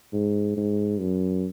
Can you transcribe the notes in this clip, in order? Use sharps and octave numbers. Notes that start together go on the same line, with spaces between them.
G#2
G#2
F#2